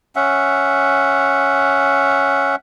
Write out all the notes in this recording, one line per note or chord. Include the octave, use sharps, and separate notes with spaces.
C#4 E5 F#5